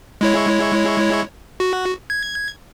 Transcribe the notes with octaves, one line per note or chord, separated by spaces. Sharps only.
G#3 E4 C#5
F#4
G#6